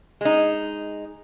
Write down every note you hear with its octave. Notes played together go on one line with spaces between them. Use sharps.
G#3 D#4